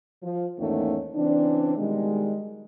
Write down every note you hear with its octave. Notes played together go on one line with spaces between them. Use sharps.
F3
E2 G#2 D#3 A3 A#3 C#4
C#3 E3 C4 D4
B2 D#3 G3 G#3